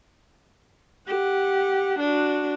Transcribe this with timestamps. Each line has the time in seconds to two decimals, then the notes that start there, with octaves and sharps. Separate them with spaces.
1.07 G4 F#5
1.99 D4 F#4